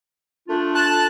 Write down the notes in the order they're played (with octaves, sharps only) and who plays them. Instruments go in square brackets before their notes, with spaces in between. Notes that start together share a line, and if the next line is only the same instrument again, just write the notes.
[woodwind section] A3 D4 F4
[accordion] A5 F#6